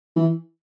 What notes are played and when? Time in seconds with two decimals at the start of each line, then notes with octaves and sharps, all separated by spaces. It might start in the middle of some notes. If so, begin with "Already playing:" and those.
0.16 E3